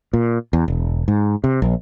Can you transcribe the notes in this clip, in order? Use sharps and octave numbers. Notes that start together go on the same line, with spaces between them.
A#2
E2
E1
G#2
C3
A#1